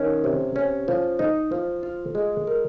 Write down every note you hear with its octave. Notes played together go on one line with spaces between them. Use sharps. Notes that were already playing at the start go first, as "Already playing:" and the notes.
Already playing: D#3 C#4
C3
C#4
F3
D#4
F3
F4
G#3
A#4